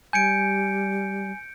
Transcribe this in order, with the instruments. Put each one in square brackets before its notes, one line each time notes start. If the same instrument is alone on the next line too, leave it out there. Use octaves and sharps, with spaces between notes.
[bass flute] G3 [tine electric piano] G#5 [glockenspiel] G6 C#7 D7